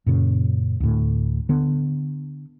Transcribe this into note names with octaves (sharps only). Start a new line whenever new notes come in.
F#2 A#2 C#3
D2 A2
D3 B3